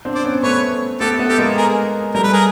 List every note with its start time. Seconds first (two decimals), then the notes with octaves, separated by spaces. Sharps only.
0.05 C4 D4
0.15 C5 D5
0.24 B3 C#4
0.43 A3 B3 B4 C#5
1.00 A3 B3 G4 A4
1.19 A3 B3
1.29 G4 A4
1.38 G#3 A#3
1.57 G#4 A#4
2.14 G3 A3 A#4
2.24 B4
2.32 G#4 A#4